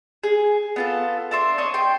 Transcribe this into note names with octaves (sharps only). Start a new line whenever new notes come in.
G#4
B3 F4 A4
D4 E5 C6
C#5 D#5 D#6
G5 C6